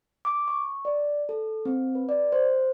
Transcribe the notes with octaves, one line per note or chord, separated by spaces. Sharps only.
D6
C#6
D5
A4
C4
B4
D5
C5